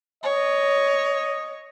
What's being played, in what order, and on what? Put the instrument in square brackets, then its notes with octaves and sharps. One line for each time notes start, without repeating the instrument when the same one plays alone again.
[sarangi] C#5 [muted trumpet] D#5